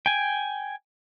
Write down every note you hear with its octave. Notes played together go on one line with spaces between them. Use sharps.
G5 G#5